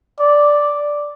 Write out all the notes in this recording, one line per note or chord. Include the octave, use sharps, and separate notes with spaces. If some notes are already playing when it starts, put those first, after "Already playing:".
D5